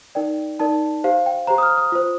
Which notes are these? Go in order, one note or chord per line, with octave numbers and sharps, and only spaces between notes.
D#4 A#4 D5 G5
D#4 A#4 D5 A5
G4 C5 F5
G5
G4 C5 A#5
D#6
F6
D#6
F4 C5